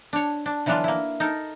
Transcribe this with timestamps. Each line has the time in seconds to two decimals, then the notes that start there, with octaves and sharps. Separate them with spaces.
0.13 D4 C#5
0.46 D4
0.66 D3 E3 F#3 B3 D4 F4
0.84 A#3 E4
1.20 D#4 A4 A#4